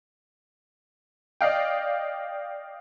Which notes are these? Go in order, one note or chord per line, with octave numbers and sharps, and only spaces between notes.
D5 D#5 F5 G5